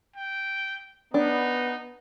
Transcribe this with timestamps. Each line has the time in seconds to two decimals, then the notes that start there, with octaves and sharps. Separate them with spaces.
0.16 G5
1.14 B3 D4 D#4